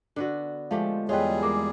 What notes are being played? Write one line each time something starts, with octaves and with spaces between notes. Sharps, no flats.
D3 B3 F#4
F3 G#3 A3 G4 F5
E2 G3 F4 G#4 B4 C#5 D#5 G5
G#3 A#3 D6